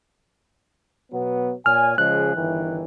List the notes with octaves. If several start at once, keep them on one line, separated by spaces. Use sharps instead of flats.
B2 F#3 B3
A#2 C#5 G#5 F6
C#3 F3 G#3 F#6
G1 D#3 E3